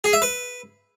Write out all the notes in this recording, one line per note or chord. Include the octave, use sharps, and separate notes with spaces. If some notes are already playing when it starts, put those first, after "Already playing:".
G#4
E5
B4